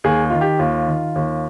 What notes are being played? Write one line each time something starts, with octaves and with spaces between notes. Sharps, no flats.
D#2 G#4
D#3 F4
G4
D#2 F4
D#3
D#2